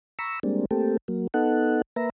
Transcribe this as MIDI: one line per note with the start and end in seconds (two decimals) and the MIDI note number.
0.19 0.39 82
0.19 0.39 83
0.19 0.39 85
0.19 0.39 88
0.43 0.65 55
0.43 0.65 56
0.43 0.65 58
0.43 0.65 60
0.43 0.65 62
0.71 0.97 57
0.71 0.97 58
0.71 0.97 60
0.71 0.97 67
0.71 0.97 69
1.08 1.27 54
1.08 1.27 58
1.34 1.82 59
1.34 1.82 63
1.34 1.82 69
1.34 1.82 78
1.96 2.10 58
1.96 2.10 71
1.96 2.10 76
1.96 2.10 82